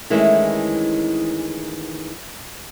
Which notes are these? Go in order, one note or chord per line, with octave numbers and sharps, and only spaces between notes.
D#3 E3 G#3 A3 C#4 E4